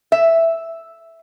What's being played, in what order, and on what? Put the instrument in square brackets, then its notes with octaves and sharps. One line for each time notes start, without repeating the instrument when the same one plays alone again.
[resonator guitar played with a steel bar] E5